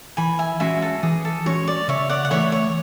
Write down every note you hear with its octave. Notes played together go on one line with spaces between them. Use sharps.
E3 G#5 B5
E5 G#5
G#3 C#4 F#4 E5 G#5
A4
E3 G#4
A4
G#3 C#4 F#4 C#5
D5
C#3 C#5 E5
D5 F#5
F#5
E3 A3 E4 C#5 E5
C#5